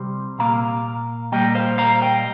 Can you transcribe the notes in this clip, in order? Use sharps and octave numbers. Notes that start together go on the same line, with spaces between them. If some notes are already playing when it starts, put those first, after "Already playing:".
Already playing: C2 C3 G3 C4
A#2 A#3 F5 A#5
A#2 G3 A#3 D#5 G5
C5 F5
F5 A#5
D#5 G5